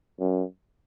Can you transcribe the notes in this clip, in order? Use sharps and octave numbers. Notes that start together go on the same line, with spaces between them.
F#2